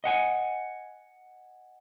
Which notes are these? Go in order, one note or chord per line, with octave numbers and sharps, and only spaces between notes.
D#5 F#5 G#5